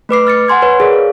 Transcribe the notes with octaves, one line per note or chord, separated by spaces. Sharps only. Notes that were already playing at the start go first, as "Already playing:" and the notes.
A3 B4 D6 C7
F6 A6 C#7
F#5 G#5 C6 G#6
B4 C#5
G#4 A#4 C#5 D5
F5